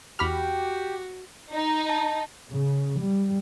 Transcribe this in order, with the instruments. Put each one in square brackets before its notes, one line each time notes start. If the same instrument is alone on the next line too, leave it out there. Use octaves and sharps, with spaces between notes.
[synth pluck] E2 B5 F6 [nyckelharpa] F#4 [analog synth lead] G4
[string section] D#4
[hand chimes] A5
[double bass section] C#3
G3